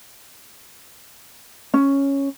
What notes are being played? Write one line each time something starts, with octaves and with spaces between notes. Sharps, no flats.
C#4